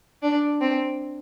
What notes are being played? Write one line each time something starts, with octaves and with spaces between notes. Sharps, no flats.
D4
C4